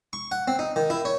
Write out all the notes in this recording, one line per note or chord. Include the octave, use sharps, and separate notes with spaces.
C#6
F#5
C4
D#4
D#3
E4
C#5